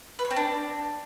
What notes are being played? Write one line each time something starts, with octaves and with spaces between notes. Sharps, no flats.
B4
C#5
C4
D4